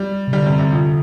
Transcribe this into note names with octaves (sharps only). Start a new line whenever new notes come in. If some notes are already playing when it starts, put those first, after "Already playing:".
Already playing: G3
C3
D3 G3
C3
C3
F2